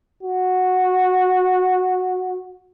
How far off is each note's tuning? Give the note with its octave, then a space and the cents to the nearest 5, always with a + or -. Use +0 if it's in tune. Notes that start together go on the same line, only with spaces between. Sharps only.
F#4 -10